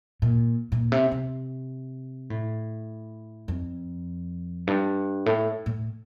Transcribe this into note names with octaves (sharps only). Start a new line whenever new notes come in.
A#2
A#2
C3
C3
A2
F2
G2
A2
A2